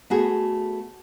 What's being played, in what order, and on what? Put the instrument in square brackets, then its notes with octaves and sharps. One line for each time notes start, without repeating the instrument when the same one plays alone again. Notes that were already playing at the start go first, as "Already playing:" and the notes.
[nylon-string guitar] A3 B3 F#4 G#4